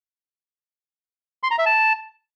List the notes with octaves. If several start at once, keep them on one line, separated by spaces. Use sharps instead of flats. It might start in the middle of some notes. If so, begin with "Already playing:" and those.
C6
A#5
E5
A5